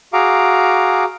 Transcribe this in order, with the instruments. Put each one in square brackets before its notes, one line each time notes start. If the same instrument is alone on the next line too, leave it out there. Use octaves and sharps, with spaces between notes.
[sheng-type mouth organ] F#4 G#4 F5 A#5 D6